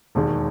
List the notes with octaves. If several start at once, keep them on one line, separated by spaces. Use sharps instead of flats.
E1 D#2 D#3 G#3